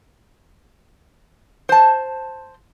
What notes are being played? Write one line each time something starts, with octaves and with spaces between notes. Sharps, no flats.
C5 A5